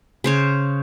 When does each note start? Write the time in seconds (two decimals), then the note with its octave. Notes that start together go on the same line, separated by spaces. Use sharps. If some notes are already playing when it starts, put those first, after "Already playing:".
0.24 C#3 C5 C#5